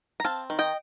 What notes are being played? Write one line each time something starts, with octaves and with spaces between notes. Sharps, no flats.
A#5
C4 F5 A5
D#3
D#5 G5